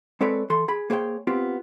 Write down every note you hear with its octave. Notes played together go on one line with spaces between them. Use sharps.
G#3 C4 A4 B4 C#5 D5
E3 A4 C6
G#4 B5
A#3 G#4 C5 C#5 G5
B3 C4 F4 G4